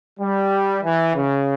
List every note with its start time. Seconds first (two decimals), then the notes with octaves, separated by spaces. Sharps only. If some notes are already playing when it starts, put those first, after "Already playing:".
0.19 G3
0.83 E3
1.16 C#3